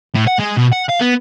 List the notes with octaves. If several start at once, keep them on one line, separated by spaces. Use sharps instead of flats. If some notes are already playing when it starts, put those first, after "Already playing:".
A2
F#5
G#3
B2
F#5
F5
B3